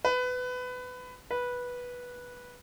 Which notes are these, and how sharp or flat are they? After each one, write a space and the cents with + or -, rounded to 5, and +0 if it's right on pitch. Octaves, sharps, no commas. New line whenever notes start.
B4 +20
B4 -10